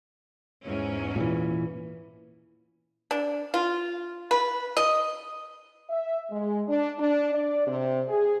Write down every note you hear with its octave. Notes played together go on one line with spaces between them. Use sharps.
E2 G#2 C#4
A#2 E3
D4
F4
B4
D#5
E5
G#3
D4
D4
D5
C3
G#4